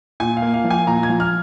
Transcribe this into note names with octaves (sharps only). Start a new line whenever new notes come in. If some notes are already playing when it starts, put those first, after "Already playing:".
A#2 G#5
F5
A#3
F5
F3
G#5
A#2 A#5
G#6
F3
F6